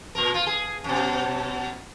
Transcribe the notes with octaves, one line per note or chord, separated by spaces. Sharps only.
A#2 A#4
F4
G#4
F#2 B2